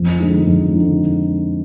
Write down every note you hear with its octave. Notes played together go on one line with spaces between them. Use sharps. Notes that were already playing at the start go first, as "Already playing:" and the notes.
Already playing: F2
D3 G#3 D#4
F2
D3 G#3 D#4